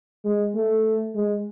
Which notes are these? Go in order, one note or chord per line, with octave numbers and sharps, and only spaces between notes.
G#3
A3
G#3